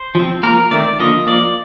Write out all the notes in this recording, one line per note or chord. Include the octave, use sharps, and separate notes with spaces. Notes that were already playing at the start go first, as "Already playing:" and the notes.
Already playing: C5
F3 C4
F3 A#3 A#4
D#3 A3 C4 D5
D3 F3 A#3 D#5
F3 A#3 D5